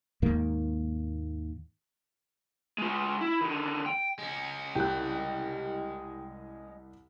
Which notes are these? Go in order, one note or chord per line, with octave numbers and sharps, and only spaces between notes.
D#2 G#2 D#3 A#3
G#3 F4
E4
D3 D#3
G5
G#3 C#4
C2 G4 G5 F#6